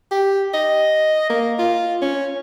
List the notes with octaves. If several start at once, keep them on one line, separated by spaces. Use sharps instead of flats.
G4
D#5
A#3
F4
C#4